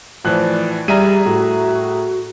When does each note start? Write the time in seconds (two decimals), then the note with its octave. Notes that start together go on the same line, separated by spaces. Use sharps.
0.24 A2 E3 F3 D5 F#6
0.88 G3 G#4 D5 E5 A#5 D#7
1.25 A2 F#4